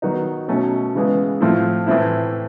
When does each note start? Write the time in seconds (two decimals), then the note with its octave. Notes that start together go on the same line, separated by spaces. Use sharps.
0.02 D#3 F#3 B3 D#4 F#4
0.48 B2 F#3 A3 C#4
0.95 C#3 E3 G#3 B3
1.41 A2 F3 A3 C4 E4
1.87 A2 E3 A3 C4 E4